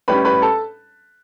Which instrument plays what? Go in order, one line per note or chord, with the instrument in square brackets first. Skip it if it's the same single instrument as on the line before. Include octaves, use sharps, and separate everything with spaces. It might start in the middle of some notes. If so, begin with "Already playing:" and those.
[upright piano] A2 G3 C#4 B4 B5
B4 B5
A4 A5